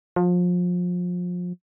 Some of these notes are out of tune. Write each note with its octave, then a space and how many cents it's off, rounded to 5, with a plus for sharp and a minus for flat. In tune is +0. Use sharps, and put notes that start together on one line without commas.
F3 +30